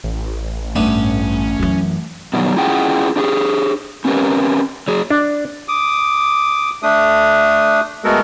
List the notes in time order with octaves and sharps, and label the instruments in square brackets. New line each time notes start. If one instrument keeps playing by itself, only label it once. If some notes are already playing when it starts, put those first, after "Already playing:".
[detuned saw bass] A1
[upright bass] G2 [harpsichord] A3 B3 D4 [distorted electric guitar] C#4
[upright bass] F#2 E3
[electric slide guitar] B2 D#3 F#3 G3
C#4 E4 F4 G#4 F#5 G5
D4 G4 G#4
C4 C#4 G4 A#4 B4
F#3 G#4
[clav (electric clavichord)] D4
[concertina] D6 D#6
A3 D4 D#6
G#3 A3 B3 F#4 A4 A#4